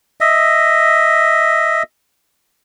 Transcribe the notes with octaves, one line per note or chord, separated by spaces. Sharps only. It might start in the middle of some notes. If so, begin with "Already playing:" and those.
D#5 E5